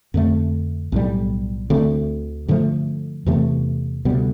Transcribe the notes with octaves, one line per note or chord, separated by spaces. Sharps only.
F2 D3 A3
B1 A2 G3
D2 D3 A3 C4
G2 D3 F3 A3
E2 C3 E3 A3
D2 C3 G3 B3